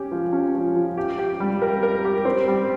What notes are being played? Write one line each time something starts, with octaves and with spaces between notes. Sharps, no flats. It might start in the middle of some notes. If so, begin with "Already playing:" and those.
Already playing: C#4 G4
F3
C#4
F3
F3
G4
G4
G3
A#4
A#4
G4
C4
G3